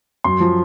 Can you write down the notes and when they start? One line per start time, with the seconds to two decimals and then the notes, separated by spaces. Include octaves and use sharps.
0.24 F#2 C6
0.40 F3